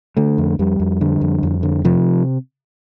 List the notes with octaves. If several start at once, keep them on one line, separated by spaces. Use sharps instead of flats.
D3 A3
F2
F2 G3
F2
D3
F2
F2
D3
C3 F3